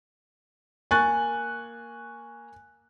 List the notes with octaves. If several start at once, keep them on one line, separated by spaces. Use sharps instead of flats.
A#3 G#5 C#6 F#6 A6